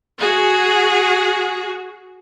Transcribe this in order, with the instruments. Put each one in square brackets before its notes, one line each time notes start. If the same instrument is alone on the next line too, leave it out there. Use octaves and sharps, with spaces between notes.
[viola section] F#4 G#4